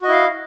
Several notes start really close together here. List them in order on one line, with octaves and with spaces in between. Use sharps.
F#4 D#5 E4 F5